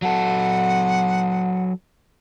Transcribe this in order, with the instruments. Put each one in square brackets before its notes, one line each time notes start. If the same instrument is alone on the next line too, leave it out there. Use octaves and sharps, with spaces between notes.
[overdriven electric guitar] F#3 A4 [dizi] F#5